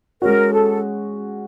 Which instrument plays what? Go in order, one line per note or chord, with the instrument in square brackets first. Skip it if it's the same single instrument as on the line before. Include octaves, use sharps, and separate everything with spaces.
[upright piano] G#3 C#4 F#4 [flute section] A#4
[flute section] A4